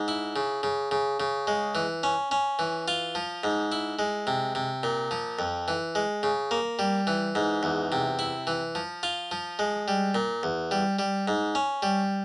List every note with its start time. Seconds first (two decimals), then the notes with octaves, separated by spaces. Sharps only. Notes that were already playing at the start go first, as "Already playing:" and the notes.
Already playing: G#2
0.08 E4
0.36 C#3
0.63 C#3
0.91 C#3
1.20 C#3
1.47 G#3
1.75 E3
2.03 C#4
2.31 C#4
2.59 E3
2.88 F4
3.15 F3
3.44 G#2
3.72 E4
3.99 G#3
4.27 C3
4.55 C3
4.83 A#2
5.11 F3
5.39 F2
5.68 E3
5.95 G#3
6.23 C#3
6.51 A#3
6.79 G3
7.07 E3
7.35 G#2
7.63 E2
7.92 C3
8.19 E4
8.47 E3
8.75 F3
9.03 F4
9.31 F3
9.59 G#3
9.88 G3
10.15 A#2
10.43 E2
10.71 G3
10.99 G3
11.28 G#2
11.55 C#4
11.83 G3